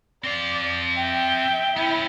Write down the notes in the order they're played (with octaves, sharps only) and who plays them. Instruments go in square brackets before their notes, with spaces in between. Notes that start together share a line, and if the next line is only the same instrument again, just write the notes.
[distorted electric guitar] C4 F5 [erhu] D5
[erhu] E5 [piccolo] G5
[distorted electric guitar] B3 C#4 [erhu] E4